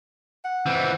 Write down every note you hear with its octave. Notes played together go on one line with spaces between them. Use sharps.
F#5
E3 C4